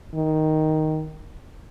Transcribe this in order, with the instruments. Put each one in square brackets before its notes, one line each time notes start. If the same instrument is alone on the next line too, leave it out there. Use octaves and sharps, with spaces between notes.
[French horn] D#3